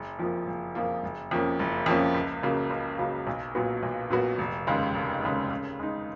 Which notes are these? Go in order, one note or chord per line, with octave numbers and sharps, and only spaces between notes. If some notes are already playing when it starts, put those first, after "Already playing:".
Already playing: F#1
F2 F3 A#3 F4
F#1
F2 F3 A#3 F4
F#1
F2 F3 A#3 C#4
F#1
F2 F3 A#3 C#4
C#2
C#3 F#3 A#3
C#2
C#3 F#3 A#3
B1
A#2 F#3 B3 F#4
B1
A#2 F#3 B3 F#4
F1
D#2 C#3 G#3
F1
D#2 C#3 G#3
C#3
G#3 D#4